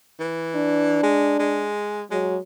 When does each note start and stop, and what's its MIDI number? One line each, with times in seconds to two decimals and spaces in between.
0.20 1.02 52
0.56 1.71 62
1.03 1.39 56
1.39 2.03 56
2.11 2.38 54
2.11 2.37 56